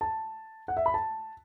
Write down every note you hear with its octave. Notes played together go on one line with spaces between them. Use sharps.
A5
F#5
E5
B5
A5